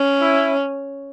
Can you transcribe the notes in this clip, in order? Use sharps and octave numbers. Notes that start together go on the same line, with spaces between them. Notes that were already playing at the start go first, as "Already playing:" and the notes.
Already playing: C#4
E4